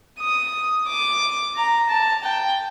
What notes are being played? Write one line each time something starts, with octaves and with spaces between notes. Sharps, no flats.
D#6
D6
A#5
A5
G5